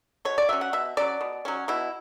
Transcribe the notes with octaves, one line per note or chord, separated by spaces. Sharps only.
B2 C#5
D5
F#3 C#4 E5
F#5
B2 E5
F#3 C#4 D5
B2
F#3 C#4
B2 E4